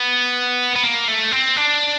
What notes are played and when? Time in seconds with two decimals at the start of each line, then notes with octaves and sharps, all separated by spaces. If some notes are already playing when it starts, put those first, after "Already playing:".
Already playing: B3
0.76 B3
0.83 A#3
1.08 A3
1.31 C4
1.56 D4